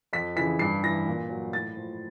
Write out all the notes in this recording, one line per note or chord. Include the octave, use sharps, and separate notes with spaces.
F2 B6
C#3 E3 B6
G2 C7
E3 A#6
A#2
F#3
A2 A6
F3